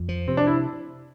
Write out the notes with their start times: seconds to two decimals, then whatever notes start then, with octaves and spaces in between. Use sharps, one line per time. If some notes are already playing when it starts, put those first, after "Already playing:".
Already playing: F2
0.09 F3
0.28 C3 C4
0.37 D4
0.47 E4